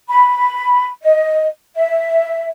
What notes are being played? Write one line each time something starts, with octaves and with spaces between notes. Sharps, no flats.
B5
D#5
E5